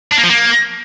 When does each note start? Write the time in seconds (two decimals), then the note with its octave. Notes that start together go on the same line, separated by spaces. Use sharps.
0.12 D4
0.18 A#3
0.24 F3
0.30 A#3